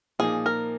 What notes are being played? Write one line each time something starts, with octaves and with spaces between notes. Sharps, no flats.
A#2 F3 A#3 D#4 G#4
A#4